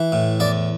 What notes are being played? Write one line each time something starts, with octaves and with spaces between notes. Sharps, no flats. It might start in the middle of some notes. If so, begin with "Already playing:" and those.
Already playing: E3
A2
E2 D5